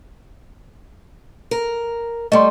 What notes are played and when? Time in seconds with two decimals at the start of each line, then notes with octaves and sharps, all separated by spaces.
1.51 A#4
2.32 G3 A3 D#5 C6